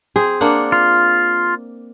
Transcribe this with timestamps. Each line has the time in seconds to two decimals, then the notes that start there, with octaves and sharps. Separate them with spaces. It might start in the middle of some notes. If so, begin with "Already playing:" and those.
0.16 C4 G#4
0.41 A#3 D4 F#5
0.72 F4